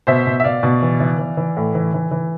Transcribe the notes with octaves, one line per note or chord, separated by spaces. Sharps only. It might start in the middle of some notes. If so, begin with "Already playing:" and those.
B2 C5 E5
B2
E5
B2 D5 F5
B2
E3
E3
E3
E3
A2
E3
E3
E3